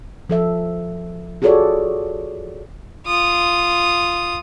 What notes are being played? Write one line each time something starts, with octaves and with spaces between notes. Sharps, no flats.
F3 A4 E5
F4 F#4 G#4 A4 C#5 D5
F4 D#6